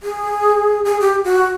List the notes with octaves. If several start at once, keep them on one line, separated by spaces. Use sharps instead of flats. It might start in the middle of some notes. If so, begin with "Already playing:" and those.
G#4
G#4
G4
F#4